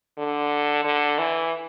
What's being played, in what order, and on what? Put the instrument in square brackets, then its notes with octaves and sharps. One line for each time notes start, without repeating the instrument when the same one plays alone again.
[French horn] D3
D3
E3